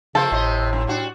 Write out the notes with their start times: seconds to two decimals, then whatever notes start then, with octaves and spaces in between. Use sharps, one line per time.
0.15 F2 C#3 A#3 A4 C5
0.32 G#1 A2 C3 C4 D#5
0.73 F#2
0.87 G3 D4 F#4